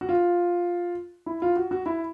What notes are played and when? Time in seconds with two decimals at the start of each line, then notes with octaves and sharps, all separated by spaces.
0.01 F#4
0.09 F4
1.26 E4
1.42 F4
1.56 F#4
1.71 F#4
1.86 E4